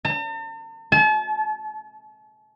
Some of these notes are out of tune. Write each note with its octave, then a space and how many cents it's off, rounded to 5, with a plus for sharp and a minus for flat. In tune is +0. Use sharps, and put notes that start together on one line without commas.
A5 +45
A5 -40